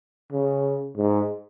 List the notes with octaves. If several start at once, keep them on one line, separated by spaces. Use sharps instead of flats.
C#3
G#2